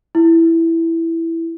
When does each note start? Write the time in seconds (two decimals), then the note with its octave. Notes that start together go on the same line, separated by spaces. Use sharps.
0.15 E4